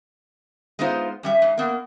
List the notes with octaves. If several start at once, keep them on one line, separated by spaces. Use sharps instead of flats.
G#3 B3 D#4 F4 C5
F#2 G3 E5
G#2
A#3 B3